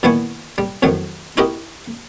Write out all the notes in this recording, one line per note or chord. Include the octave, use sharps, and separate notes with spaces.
A#2 D#3 B3 E4 G#5 C#6
G3
F2 A2 D#3 F#3
D#4 E4 F#4 G4 A#4 D#5